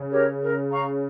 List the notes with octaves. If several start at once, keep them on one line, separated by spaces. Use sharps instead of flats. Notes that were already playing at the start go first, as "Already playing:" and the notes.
Already playing: C#3
G4 A#4 C#5
A#4
F5 A#5 C#6